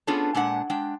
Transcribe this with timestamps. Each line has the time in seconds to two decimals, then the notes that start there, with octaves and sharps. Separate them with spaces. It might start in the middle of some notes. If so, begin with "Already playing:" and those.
0.07 B3 C#4 D4 F4 G#4 A4
0.35 A#2 G#3 D4 F#5
0.70 G#3 D4 G5